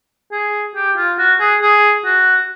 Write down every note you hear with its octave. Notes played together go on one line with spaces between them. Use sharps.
G#4
G4
F4
F#4
G#4
G#4
F#4